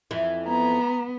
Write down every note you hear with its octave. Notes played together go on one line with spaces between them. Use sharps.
F2 E3
B3 A#5